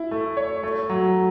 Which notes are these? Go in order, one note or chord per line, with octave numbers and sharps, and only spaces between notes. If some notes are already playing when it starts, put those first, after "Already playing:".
Already playing: E4
A3
C#5
A3
F#3